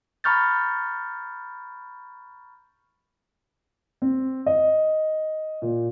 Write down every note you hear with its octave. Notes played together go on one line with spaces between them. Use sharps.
A#5 B5 C#6 F6 G6 A6
C4
D#5
A#2